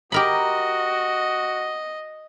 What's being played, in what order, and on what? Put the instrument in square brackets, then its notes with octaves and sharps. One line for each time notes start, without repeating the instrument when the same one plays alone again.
[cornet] F#4 [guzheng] G4 A#4 B5 [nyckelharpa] D#5